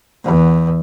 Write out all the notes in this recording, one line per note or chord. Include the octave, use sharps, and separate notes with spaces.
E2